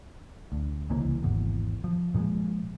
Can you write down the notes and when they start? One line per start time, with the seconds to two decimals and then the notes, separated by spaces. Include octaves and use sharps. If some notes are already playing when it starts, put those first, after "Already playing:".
0.52 D2
0.90 C2 C#3 E3 A#3
1.23 G#1 E2
1.84 F3
2.14 A#2 F3 F#3 G#3